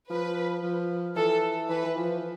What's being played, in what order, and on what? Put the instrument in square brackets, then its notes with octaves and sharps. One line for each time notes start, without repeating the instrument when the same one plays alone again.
[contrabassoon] F3 [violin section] B4
[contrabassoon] F3
[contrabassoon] E3 [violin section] A4
[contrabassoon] E3 [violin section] B4
[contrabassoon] E3
F3